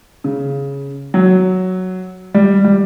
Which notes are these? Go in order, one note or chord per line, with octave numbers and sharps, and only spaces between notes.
C#3
F#3
G3
G3